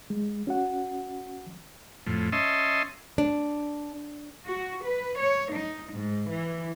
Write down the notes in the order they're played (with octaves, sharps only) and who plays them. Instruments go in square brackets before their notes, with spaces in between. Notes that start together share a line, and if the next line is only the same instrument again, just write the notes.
[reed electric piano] G#3
C#4 F#4 F#5
[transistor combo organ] F2 A2
C#4 D#5 E5 A5 C6
[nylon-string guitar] D4
[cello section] F#4
B4
C#5
D#4
G#2
E3